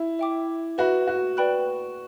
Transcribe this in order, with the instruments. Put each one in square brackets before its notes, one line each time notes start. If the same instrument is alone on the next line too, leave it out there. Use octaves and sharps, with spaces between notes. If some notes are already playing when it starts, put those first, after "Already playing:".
Already playing: [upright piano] E4
[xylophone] E5 G5 D6
[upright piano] F#4 [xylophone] B4 E5 B5
[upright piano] F#4
[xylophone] B4 D5 G5 B5 F#6